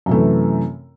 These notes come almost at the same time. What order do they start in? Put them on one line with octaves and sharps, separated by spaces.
F#2 C3 A3 E3